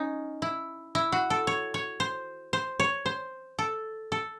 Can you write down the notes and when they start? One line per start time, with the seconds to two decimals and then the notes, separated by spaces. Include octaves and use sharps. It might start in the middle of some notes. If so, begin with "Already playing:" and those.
Already playing: C#4 D#4
0.42 E4
0.95 E4
1.12 F#4
1.30 A4
1.47 C#5
1.74 C#5
2.00 C5
2.53 C5
2.80 C#5
3.06 C5
3.59 A4
4.12 A4